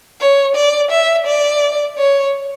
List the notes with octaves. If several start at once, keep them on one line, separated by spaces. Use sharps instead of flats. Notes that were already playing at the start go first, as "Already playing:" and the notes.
C#5
D5
E5
D5
C#5